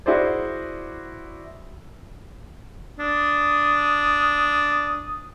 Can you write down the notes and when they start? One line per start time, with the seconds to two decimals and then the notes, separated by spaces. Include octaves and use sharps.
0.06 E4 F#4 G#4 C5 D5
2.99 D4 D#6